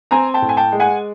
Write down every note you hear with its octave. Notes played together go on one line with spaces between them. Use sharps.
C4 G#5 A#5
G5 A5
A2
G#5
G5 A5
G#3
F#5 G#5